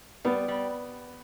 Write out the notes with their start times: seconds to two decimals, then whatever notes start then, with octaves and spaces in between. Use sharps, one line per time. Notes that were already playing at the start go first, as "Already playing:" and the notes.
0.25 G3 B3
0.48 G3